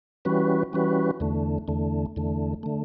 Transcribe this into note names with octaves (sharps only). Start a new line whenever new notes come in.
E3 G3 C#4 F#4 B4
E3 G3 C#4 F#4 B4
E2 D3 A3
E2 D3 A3
E2 D3 A3
D3 A3